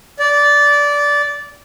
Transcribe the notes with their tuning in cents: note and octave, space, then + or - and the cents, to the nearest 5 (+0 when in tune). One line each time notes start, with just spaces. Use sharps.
D5 -15